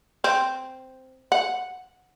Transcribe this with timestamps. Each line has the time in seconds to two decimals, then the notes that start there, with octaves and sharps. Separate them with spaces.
0.24 C4
1.32 F#5